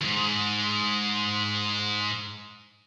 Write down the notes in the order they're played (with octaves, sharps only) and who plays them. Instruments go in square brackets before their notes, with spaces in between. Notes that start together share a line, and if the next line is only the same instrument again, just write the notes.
[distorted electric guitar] D#2 G#2